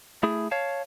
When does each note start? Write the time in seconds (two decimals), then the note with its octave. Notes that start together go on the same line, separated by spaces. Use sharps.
0.23 A3 E4 G#4
0.51 C#5 F5 A5